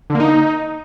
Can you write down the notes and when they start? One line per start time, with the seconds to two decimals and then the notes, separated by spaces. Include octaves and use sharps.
0.10 D3
0.15 A#3
0.20 D#4